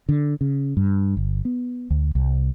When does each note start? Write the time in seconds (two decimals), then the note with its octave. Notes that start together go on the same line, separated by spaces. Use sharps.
0.09 D3
0.41 C#3
0.77 G2
1.17 G1
1.45 B3
1.90 D2
2.15 C2